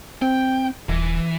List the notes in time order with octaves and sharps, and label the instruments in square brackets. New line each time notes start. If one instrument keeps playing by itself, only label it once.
[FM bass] C4 [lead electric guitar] G5
[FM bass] D#1 [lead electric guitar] E3